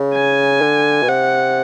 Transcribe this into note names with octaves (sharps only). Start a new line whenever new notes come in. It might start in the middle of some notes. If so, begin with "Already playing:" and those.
Already playing: C#3
G#5
D3
B2
C3 F#5